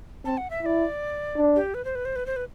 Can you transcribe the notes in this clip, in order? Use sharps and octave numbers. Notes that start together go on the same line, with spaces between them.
C4 A5
F#5
E5
E4 D5 E5
D4
G4
B4
C5
B4
C5
B4
C5
B4